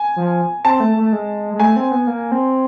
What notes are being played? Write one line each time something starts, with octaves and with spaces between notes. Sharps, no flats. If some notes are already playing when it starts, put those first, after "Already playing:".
Already playing: G#5
F3
C4 A5
A3
A3
G#3
G#3
A3 G#5
C4
B3
A#3
C4